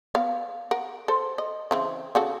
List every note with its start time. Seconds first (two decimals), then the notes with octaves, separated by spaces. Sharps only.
0.15 B3 F5
0.71 A#4 F#5
1.08 A4 C5
1.38 D#5
1.71 C#3 E3 C4
2.15 C#3 F#4 A4